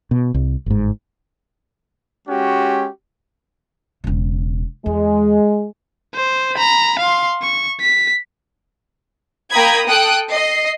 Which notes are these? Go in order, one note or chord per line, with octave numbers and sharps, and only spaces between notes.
B2
C2
G1 G#2
G#3 C#4 F#4 G4
E1 C#3
E2 G#3
C5
A#5 B5
F5 C6
C#6
B6
A#3 G5 A#5 B5 D#6 G#6
A4 G5 D#6 F#6
D#5 C7